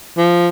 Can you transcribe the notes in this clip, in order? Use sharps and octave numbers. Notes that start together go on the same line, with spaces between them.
F3